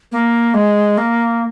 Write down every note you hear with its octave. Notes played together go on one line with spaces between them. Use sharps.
A#3
G#3
A#3